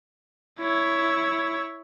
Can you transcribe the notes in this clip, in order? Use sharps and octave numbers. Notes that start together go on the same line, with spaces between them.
E4 C#5